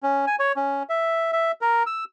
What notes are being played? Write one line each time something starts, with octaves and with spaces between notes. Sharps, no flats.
C#4
G#5
C#5
C#4
E5
E5
A#4
E6